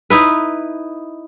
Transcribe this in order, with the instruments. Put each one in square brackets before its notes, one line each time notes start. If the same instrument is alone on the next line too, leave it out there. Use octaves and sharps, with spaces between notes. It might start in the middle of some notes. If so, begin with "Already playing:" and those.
[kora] D#4 E4 B4